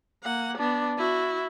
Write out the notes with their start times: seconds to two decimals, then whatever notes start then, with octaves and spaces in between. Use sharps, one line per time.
0.23 A#3 F#5
0.57 B3 D4
0.98 E4 F#4